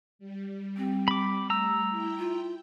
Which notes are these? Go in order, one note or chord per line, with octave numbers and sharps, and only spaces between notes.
G3
C4
B5 D6
A3 A#5 E6
E4 G5
F4